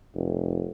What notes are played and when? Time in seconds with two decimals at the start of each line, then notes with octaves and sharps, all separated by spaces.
0.15 F1